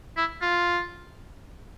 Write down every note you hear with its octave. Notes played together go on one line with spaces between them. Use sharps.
E4
F4